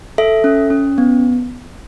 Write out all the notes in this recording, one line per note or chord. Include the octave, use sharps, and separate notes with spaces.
A4 E5
C#4
C#4
B3